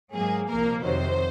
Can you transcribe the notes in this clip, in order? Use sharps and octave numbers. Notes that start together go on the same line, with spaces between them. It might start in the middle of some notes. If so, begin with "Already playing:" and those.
G#2 F#3 A#3 G#4
C2 A#2 F3 A#3 A#4
F2 C3 D#3 F#3 C5